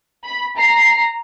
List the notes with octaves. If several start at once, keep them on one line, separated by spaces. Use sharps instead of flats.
B5
A#5 C7